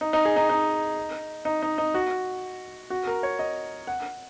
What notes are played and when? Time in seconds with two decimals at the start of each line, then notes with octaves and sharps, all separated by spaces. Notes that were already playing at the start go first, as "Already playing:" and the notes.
0.01 D#4
0.13 D#4
0.25 G#4
0.36 D#4
0.50 D#4
1.45 D#4
1.62 D#4
1.78 D#4
1.94 F#4
2.90 F#4
3.07 A#4
3.23 C#5
3.39 D#5
3.87 F#5